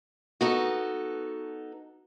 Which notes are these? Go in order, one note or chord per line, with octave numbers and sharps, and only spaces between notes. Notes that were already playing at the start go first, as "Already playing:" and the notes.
B3 D#4 F#4 A4